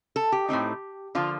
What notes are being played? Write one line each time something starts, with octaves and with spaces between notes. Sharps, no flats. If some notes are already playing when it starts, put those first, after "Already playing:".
A4
G4
A2 A3 C4 D#4
D3 F3 A#3 F4